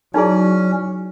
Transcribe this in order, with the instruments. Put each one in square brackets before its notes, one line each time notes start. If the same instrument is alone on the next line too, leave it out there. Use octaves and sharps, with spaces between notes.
[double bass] F#3 [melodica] C#4 [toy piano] D#4 E4 G#4 [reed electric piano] C#5 D5